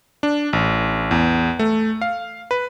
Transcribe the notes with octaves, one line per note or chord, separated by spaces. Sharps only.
D4
A1
E2
A3
F5
B4